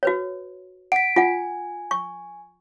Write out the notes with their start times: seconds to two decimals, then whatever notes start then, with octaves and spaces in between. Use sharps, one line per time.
0.03 F#4 B4 C#5
0.92 F#5 B6 D7
1.16 F4 F#5 G#5
1.91 C#6